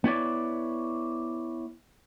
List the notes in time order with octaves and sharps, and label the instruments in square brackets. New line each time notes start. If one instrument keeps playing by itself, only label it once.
[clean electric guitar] B3 E4 C#5 D5